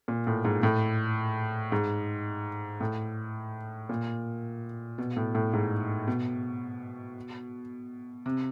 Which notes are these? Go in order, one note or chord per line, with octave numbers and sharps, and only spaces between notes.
A#2
A2
G#2
A2
G#2
A2
A#2
B2
A2
A2
G#2
B2
C3